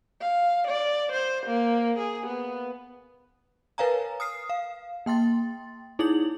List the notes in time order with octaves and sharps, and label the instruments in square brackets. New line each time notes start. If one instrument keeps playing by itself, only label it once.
[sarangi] F5
D5
C5
A#3
G#4
B3
[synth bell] A#4 B4 C#5 F5 G#5 A#5
D#6 F6 C7
F5
A#3 G5 C6 A6
D#4 E4 G#4 F#7